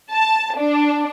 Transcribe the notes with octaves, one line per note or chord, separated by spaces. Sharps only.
A5
D4